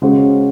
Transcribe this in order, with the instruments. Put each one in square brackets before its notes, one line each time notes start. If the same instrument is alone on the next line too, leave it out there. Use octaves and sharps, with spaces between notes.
[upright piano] C#3 G#3 C#4 F#4 C5